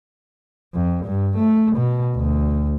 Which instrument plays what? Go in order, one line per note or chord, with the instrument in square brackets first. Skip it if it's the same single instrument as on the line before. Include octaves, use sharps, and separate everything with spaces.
[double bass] F2
G2
A3
B2
D2